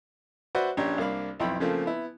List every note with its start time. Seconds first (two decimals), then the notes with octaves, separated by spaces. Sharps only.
0.55 F#4 B4 C5 D5 E5 F#5
0.77 A#1 C#4 D4 G4 C#5 A#5
0.98 C2 A#3 D4 F5 B5
1.40 B1 F2 E4 G5 B5
1.60 C#3 F3 A3 A#3 C4
1.86 B3 E4